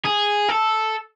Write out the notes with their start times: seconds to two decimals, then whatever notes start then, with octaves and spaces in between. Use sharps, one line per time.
0.05 G#4
0.49 A4